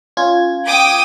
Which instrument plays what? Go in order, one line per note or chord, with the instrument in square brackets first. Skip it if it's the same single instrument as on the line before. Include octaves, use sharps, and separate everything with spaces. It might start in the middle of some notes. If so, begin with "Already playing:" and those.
[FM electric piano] C#4 F4 G#6
[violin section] G5 D6 D#6